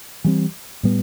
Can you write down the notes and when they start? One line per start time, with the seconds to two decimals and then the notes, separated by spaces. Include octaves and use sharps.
0.24 E3 G3 C4
0.83 A2 G3 B3